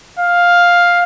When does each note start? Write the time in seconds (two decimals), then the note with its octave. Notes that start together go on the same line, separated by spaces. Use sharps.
0.19 F5